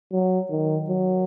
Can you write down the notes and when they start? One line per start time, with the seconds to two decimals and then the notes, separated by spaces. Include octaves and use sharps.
0.12 F#3
0.50 D#3
0.89 F#3